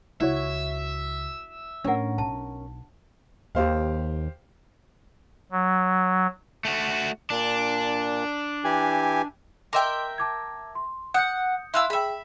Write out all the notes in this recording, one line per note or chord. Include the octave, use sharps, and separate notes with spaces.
C#2 E4 F#4 C#5 E5
A2 C#4 D4 A#4 F#5
B1 A5
D#2 G4 C5 F5
F#3
A3 F#4
A#2 D4
E3 G4 G#5
A#4 D#5 E5 G5 C6 D6
A5 D6 G#6
C6
F#5 D#6 G6 C#7
E4 E5 F5 C6 E6 F#6
G#4 E5 G5 B5